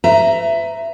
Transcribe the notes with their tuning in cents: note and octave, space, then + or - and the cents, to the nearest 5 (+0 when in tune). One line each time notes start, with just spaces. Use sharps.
B4 +40 E5 +15 A#5 +0